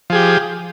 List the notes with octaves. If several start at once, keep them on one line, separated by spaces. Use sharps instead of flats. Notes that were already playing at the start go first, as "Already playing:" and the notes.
F3 G4 G#4